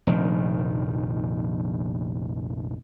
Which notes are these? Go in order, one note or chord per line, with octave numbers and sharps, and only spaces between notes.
F1 A#1 D#3